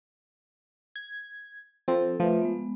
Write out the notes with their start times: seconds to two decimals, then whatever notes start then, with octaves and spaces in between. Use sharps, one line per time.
0.96 G#6
1.88 F3 C4 A4
2.20 F3 A3 B4 E5
2.42 G#3 B3